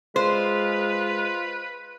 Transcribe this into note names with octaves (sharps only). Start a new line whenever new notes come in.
G#3 F4 B4 C5